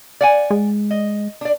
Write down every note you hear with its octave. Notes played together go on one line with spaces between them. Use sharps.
D5 F#5 G#5
G#3
D#5
D4 D5